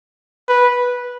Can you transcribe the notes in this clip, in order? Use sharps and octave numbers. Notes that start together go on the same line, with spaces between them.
B4